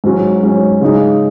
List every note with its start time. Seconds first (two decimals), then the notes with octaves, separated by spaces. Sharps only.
0.04 G#2 F#3 C#4
0.43 G#2 F#3 C#4
0.81 C#3 G#3 D#4